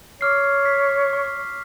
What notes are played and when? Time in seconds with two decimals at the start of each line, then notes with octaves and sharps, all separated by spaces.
0.21 C#5 D6 F6 C7
0.65 B6
1.13 C#6